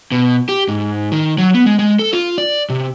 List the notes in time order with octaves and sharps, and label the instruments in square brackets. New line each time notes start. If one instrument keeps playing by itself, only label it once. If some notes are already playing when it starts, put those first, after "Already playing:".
[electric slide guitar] B2
G4
G#2
D#3
F#3
B3
G#3
G#3
A4
F4
D5
C3